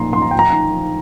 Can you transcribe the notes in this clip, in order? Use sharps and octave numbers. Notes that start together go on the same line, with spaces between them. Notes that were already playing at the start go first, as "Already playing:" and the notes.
Already playing: A#2 F3 D#4 A#5 C6
F3 D#4 C6
A#5
F3 G5
A#5
D#4
F3